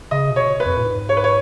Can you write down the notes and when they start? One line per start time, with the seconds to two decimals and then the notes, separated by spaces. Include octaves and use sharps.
0.11 C#3 D#5
0.31 B2
0.36 C#5
0.60 B4
0.66 F2
0.77 A#2
0.85 G#2
1.09 C#5
1.17 B4
1.24 C#5